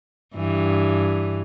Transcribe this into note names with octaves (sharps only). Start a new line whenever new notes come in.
G2 E3